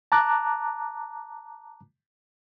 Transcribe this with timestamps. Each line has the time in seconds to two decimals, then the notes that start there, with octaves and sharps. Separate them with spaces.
0.12 A5 A#5 D6 F#6